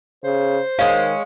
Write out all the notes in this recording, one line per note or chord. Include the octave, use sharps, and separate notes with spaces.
C#3 C5
D#3 G#3 C#4 F5